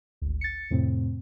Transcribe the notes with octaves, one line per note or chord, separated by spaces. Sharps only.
G#1 D2
A6 C#7
F2 A2 C3 C4